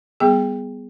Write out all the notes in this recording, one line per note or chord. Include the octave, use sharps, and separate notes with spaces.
G3 B3 G#4